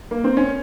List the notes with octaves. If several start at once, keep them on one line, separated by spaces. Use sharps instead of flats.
A#3
C4
C#4